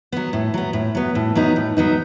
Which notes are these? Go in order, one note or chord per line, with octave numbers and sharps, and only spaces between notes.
F#3 B3
A2
F#3 B3
A2
F#3 B3
A2
F#3 B3 D#4
A2
F#3 B3 D#4